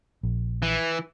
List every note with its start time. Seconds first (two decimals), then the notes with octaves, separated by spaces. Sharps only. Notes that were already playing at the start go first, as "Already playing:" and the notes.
0.23 A#1
0.62 E3